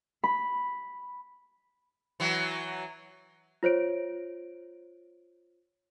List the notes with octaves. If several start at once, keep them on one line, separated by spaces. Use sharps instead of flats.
B5
E3 F#3
F4 C5 C#5 D7